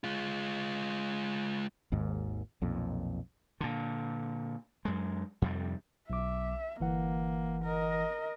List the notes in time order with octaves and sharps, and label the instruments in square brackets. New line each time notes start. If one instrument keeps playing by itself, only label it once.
[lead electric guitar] G#3 F4
[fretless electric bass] G#1 D#2 G#2
B1 F2 A#2
[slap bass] A#2 D3
F#2 G#3
F2 C3 G3
[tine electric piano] B1 D6 [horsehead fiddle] E5
[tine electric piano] G1 E3 F#5 [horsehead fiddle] A#3
[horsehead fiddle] A#4 D#5